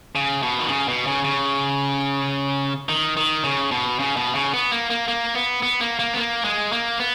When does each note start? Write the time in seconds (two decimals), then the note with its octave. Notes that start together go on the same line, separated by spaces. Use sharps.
0.16 C#3
0.43 B2
0.59 D#3
0.69 C#3
0.88 B2
1.07 C#3
1.25 C#3
2.89 D#3
3.17 D#3
3.44 C#3
3.71 B2
3.99 C#3
4.17 B2
4.35 C#3
4.54 B3
4.72 A#3
4.90 A#3
5.08 A#3
5.35 B3
5.63 B3
5.81 A#3
5.99 A#3
6.14 B3
6.18 A#3
6.45 G#3
6.72 A#3
7.00 B3